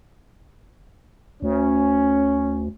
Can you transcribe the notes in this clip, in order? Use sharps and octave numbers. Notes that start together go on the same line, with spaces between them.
D2 C#4